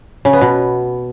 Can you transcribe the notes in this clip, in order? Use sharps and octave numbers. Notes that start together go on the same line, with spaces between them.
C#3
B3
B2